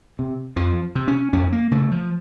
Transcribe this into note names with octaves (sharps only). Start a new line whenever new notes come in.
C3
F2 F3
C3
C#4
F2 C#4
A#3
C#3 A3
F3